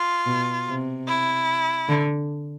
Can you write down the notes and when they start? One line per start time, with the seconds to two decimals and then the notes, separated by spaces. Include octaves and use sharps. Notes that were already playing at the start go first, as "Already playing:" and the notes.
Already playing: F4
0.26 B2
0.67 C3
1.08 E4
1.89 D3